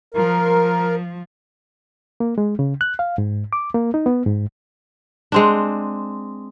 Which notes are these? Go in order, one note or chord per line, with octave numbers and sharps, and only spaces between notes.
F3 A#4
A#3
G#3
C#3
F#6
F5
G#2
D6
A#3
D#4
B3
G#2
G#3 C4 D4